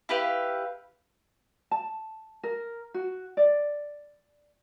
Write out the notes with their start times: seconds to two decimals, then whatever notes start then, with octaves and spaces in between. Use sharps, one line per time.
0.09 E4 G4 B4 F5
1.71 A5
2.43 A#4
2.94 F#4
3.37 D5